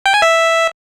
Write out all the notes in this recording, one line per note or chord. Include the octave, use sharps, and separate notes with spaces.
G5
G#5
E5